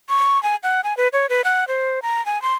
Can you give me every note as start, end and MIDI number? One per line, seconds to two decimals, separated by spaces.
0.09 0.41 85
0.43 0.56 80
0.63 0.81 78
0.84 0.96 80
0.97 1.08 71
1.13 1.26 73
1.29 1.42 71
1.44 1.65 78
1.68 2.00 72
2.02 2.24 82
2.26 2.41 80
2.42 2.54 84